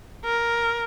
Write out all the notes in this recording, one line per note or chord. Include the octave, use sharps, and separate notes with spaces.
A#4